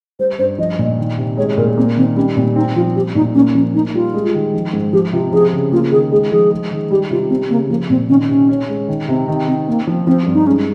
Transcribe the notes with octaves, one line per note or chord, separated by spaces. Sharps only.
G3 C5
G2 C5
F3 D#5
A#2
D#3
C3
G#3 C#5
A#2 A#4
A#3 C4
D#3 C4
G3 C#4
A#2 C4
C4 D#4
F3 F4
G3 G4
A#2 D#4
A#3 C#4
F3 C#4
A#3 D#4
G3 F4
G#3
D#3
F3
G#2
F3 G4
C3 F4
F3 G#4
C#3
A#3 F4
D#3 G#4
G#3 G#4
F3 G#4
G#3
D#3
G3 G4
C3 F4
G3 C4
C#3 A#3
F3 A#3
A#2 C4
D#3 C#4
C3 C#4
C#4
G#3
D#3
C3 C4
D#3
C3 C4
A#3 C4
F3
F3 C4
G2
D#4
G#3 C#4